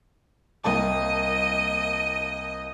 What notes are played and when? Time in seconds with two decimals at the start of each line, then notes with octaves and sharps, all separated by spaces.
0.64 C2 A#3 D#5 A5